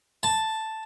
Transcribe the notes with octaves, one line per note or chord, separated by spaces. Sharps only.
A5